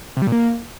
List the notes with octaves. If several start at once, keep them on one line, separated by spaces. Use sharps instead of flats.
C3
G3
A#2
A#3